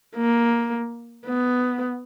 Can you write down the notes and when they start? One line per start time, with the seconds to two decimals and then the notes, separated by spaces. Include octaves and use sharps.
0.16 A#3
1.26 B3